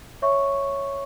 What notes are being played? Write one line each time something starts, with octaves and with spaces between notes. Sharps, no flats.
C#5 E5 C#6